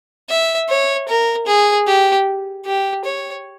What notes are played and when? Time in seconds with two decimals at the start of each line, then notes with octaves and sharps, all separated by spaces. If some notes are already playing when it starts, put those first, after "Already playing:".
0.30 E5
0.69 C#5
1.08 A#4
1.47 G#4
1.87 G4
2.66 G4
3.05 C#5